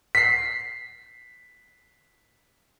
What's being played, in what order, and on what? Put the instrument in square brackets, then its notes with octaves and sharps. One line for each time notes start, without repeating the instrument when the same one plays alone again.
[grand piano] B6 C7